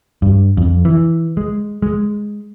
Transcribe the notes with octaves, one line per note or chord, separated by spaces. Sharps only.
G2
F2
E3
G#3
G#3